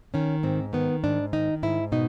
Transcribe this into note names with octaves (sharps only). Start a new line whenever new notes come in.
D#3 C#4
G#2 C4
D#3 B3
G#2 D4
D#3 D#4
G#2 E4
B2 D#4